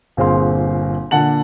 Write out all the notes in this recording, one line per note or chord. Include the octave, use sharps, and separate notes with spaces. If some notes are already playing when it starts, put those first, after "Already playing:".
G1 A#2 C4 G#4 F5 C6
A#2 D3 F#5 A5 F#7